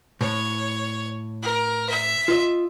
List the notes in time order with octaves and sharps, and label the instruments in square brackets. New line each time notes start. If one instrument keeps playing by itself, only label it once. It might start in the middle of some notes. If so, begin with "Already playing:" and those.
[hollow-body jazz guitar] A2 [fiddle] C#5
[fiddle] A#4
E5
[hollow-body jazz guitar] F4 D#5